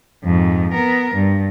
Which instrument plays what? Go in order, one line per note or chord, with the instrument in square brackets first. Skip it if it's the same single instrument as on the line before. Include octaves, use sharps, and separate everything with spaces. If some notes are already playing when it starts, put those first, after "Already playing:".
[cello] F2 G#2
B3 A#4
G2